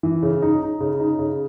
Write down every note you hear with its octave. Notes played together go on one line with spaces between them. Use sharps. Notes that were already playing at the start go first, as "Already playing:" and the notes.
E3
C#3
D#4
D#4
C#3
D#4
C#3